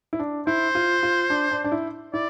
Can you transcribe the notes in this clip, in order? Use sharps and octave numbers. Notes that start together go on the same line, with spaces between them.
E4
D4
E4 C5
F4
F4
D4
D4
D4
E4
E4 D5